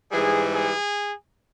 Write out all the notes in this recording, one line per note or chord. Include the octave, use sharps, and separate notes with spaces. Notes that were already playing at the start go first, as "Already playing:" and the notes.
G#2 E3 G3 G#4
G#4